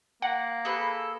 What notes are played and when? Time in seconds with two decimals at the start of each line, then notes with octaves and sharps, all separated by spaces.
0.22 A#3 F#5
0.65 G#4 A4 B4